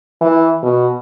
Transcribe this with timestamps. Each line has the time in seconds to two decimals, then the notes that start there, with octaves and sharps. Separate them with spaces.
0.21 E3
0.63 B2